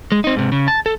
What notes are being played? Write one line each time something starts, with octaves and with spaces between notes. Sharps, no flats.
G#3
C4 D#4
G#2 C3
C#3
A5
A4